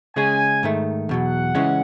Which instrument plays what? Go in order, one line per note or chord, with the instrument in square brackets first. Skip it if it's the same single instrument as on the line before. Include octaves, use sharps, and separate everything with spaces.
[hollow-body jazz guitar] C#3 G#3 C#4 G#4 [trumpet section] G#5
[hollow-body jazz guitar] G#2 D#3 A3
[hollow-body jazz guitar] E2 B2 F#3 [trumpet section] F#5
[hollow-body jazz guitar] C#3 E3 G#3 C#4